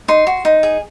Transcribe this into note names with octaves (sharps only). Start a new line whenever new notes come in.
D#4 C6
F#4
D#4
G#4